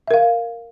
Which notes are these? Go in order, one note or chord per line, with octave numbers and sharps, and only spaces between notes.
A#4 E5 F5